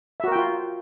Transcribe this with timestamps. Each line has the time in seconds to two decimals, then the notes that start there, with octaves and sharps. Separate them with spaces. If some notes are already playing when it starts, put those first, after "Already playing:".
0.20 E5
0.24 F#4
0.28 A#4
0.32 G5
0.36 F4